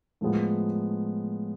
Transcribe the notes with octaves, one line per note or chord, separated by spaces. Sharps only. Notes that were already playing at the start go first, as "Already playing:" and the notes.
A2 F3 G#3 B3